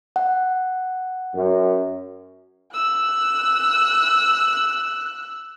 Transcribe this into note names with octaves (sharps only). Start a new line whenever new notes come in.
F#5
F#2
E6 F#6